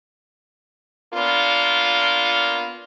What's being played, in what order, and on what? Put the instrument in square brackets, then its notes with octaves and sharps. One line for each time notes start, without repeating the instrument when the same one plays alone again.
[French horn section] A#3 B3 D4 F4